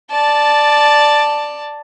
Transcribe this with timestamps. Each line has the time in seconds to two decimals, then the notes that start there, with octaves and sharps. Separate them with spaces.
0.11 D5 A5